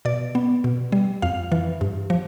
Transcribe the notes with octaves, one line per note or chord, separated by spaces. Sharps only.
B2 D5
B3
B2
G3
F2 F5
E3
G2
F3